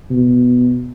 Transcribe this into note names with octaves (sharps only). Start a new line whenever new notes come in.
B2